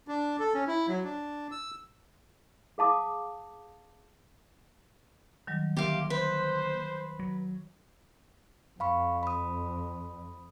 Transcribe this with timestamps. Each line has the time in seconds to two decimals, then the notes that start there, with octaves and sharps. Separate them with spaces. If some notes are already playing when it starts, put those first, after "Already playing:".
0.08 D4
0.39 A4
0.54 C#4
0.68 E4
0.88 F#3
1.04 D4
1.51 E6
2.78 G#4 F5 A5 D6 D#6
5.47 D#3 F#3 G3
5.77 D3 A#3 G4 A#4 E5 F5 C6
6.10 B4 C5
7.19 F#3
8.80 F2 F5 B5 C#6
9.23 B5 D#6